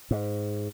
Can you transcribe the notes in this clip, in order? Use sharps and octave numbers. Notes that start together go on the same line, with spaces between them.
G#2